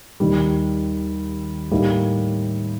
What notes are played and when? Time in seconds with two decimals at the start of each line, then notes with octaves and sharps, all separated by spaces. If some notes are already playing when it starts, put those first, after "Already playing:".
0.20 D#2 D#3 G3
1.71 A2 G3 A#3 D#4